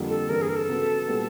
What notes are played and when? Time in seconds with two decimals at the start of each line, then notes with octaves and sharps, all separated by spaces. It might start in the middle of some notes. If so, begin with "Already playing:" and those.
Already playing: F2 D3 G3 A#3
0.09 A4
0.29 G2 E3 G3 A#4
0.42 G#4
0.49 A#4
0.56 A4
0.69 C#3 F#3 B3
1.08 A#2 G3 B3